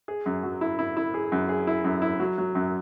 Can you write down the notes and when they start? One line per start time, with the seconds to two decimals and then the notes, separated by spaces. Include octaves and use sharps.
0.08 G#4
0.26 F#2
0.43 F#3
0.61 E4
0.79 E4
0.97 E4
1.14 G#4
1.32 F#2
1.49 G#4
1.67 E4
1.84 F#2
2.02 E4
2.19 F#3
2.38 F#3
2.55 F#2